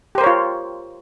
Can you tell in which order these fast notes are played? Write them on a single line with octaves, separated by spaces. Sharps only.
G4 C5 A#4 C#5 F4